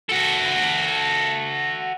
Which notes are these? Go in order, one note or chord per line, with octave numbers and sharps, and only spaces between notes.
F#4 A4